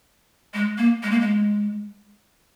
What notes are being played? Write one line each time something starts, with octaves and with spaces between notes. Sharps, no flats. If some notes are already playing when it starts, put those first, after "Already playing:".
G#3
A#3
G#3
A#3
G#3